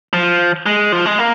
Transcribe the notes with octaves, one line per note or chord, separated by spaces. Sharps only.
F3
G#3
F3
G#3
A#3